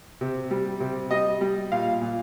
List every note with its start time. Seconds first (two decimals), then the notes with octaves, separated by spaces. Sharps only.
0.21 C3
0.51 G3
0.80 C3
1.11 G3 D#5
1.41 G3
1.72 A#2 F5
2.01 A#2